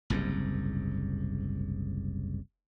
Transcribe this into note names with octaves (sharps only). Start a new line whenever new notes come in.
F#1 C2 G#2